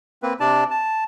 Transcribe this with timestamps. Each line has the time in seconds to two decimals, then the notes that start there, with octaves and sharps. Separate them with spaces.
0.23 A#3 C4 B4
0.40 C3 D4 D5 A5
0.71 A5